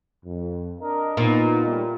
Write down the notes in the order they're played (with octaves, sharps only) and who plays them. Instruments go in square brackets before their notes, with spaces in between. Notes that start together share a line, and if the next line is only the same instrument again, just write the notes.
[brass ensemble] F2
D4 A#4 D#5
[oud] A#2 [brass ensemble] B3 D#4
[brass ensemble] A2 G3